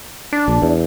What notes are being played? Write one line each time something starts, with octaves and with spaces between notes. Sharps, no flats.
D4
A#1
E2